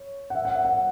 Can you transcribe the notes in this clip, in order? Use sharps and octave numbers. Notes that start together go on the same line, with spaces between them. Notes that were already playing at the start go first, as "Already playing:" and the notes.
Already playing: C#5
F#5
E5
F#5
E5
F#5